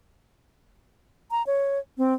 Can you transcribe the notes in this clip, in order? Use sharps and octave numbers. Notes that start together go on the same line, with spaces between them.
A#5
C#5
C4